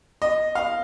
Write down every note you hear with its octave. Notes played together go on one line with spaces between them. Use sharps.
D#5
F5